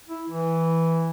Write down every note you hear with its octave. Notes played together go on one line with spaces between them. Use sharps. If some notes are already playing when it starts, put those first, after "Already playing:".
E4
E3